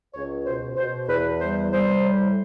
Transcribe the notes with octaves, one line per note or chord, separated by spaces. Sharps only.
C#2 C#5
B2 C5
B2 C5
E2 B4
G3 C5
G3 C5
A2